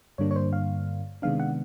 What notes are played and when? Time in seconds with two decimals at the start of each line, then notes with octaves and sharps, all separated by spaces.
0.18 G2 D3 G3 A#3 D4 C#5
0.31 C#5
0.36 C5
0.53 F5
1.22 C3 D#3 G#3 B3 D4 F5
1.40 F#5